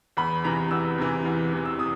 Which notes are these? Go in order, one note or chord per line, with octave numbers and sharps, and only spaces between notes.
E2 B5
C3 E3 A#5
E2 E6
C3 E3
E2
C3 E3
E6
D#6